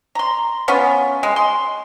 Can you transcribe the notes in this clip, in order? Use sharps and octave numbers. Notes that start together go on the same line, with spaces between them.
A#5 C6
B3 C#4 F4
G#3
C6